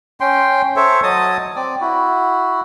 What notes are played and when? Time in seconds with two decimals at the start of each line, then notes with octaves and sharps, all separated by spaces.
0.21 C#4 G5 C6
0.76 A4 C5 C#5 E5
1.03 F#3 D#5 A5 D#6
1.56 C4 D5
1.81 E4 F#4